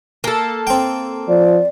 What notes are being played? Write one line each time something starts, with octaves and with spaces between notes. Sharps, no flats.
A#3 A4
C4 G5
F3 D5